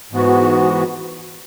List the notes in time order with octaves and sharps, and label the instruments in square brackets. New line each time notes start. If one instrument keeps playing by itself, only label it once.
[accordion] G#2 E3 B3 F#4